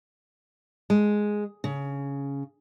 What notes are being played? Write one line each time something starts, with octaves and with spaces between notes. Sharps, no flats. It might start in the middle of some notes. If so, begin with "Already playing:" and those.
G#3
C#3